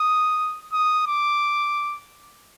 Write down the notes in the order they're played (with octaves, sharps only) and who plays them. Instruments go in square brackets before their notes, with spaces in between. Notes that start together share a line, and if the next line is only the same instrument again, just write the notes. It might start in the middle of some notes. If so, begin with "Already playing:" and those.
Already playing: [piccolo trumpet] D#6
D#6
D6